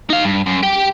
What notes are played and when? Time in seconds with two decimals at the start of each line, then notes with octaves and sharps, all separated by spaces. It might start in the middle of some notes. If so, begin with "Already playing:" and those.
0.10 D#4 F5
0.24 G2
0.46 F#2
0.63 G4 G5